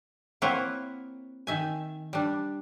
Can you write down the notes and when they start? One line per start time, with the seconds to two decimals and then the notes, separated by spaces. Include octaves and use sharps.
0.42 A#3 C4 E4 B4 C#5 F#5
1.47 D#3 E5 G#5
2.13 G3 D4